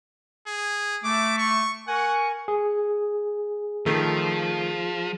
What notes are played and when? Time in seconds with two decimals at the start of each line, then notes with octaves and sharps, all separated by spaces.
0.47 G#4
1.05 A3 D6
1.38 C#6
1.88 A#4 F#5 G#5 C#6
2.48 G#4
3.86 D#3 F3 A3